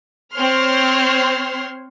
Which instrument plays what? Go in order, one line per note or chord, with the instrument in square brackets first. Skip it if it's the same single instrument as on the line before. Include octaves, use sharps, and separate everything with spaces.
[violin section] C4 C5 C#5 C6 F6